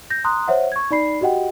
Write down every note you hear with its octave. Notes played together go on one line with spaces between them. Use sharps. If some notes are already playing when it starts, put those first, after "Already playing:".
G6 A#6
A#5 C6 D#6 F#6
C5 C#5 E5 F#5
C#6 G#6
D#4 D5 B5 C7
F#4 G4 D#5 F#5 G5